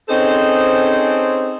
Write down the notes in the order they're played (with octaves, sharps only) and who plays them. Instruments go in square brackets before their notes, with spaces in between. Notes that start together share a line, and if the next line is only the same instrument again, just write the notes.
[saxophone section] C4 C#4 D#4 G#4 A4 C5